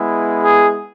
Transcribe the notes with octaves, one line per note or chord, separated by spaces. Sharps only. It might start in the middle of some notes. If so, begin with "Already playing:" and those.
Already playing: G#3 B3 E4
G#4